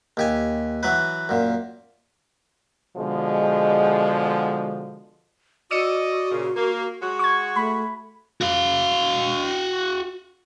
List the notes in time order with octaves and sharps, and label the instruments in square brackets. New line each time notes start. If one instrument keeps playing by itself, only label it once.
[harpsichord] D#2 G4 G#5
E3 F#3 B4
F#2 A#2
[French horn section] B2 D3 F3 G#3
[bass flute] F#4 [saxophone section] D5 D#5 [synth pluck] E6 C#7 D#7
[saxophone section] A#2 C#3
A#3
G#3 F#4
[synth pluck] C#6 G#6
[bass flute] A3 [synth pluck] B5
[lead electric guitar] F#4 F5